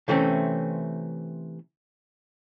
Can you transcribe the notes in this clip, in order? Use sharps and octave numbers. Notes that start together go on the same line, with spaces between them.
C3 E3 A3 C4 C#4